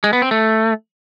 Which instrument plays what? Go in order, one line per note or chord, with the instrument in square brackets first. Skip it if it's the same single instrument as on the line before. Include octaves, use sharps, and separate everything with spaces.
[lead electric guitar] G#3
B3
C4
A3